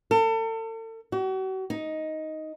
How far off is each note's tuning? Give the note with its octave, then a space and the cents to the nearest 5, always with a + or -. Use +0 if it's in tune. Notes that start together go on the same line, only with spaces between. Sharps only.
A4 +40
F#4 +40
D#4 +5